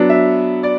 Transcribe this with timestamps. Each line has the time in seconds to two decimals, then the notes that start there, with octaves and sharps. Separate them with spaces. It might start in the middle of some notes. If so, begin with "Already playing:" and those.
Already playing: F#3 B3 D4
0.09 E5
0.63 D5